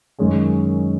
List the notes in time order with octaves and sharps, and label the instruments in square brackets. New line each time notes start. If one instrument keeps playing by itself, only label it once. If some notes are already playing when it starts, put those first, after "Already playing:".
[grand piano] F#2 D#3 G#3 C#4 G#4